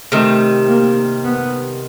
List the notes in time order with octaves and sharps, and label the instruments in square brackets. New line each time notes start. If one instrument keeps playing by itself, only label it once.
[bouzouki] C3 D#3 G3 [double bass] A3
[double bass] A#3
B3